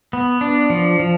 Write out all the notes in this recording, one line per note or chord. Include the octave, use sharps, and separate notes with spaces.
B3
D4
F3
F3